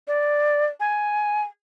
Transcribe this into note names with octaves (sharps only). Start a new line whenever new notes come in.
D5
G#5